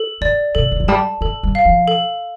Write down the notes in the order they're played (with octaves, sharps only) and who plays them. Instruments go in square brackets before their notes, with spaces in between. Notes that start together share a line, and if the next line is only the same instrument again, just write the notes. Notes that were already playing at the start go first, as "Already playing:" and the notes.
Already playing: [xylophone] A4
[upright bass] A3 [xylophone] D5
[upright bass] C3 [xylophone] A4
[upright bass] D3
F3
[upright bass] G3 [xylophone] A5
[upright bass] A3 [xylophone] A4
[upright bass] G3
[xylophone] F5
[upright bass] F3
[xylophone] A4